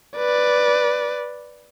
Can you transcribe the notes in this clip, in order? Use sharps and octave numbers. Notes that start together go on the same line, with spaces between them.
B4 D5